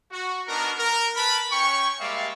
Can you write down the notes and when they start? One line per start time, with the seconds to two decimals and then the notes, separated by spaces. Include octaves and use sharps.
0.12 F#4
0.48 B3 D4 D#4 F#4 A#4
0.78 A#4
1.16 A#4 B4 A5 B5
1.52 C#4 C#5 G5 C#6
2.00 G3 G#3 A#3 D5 E5 F5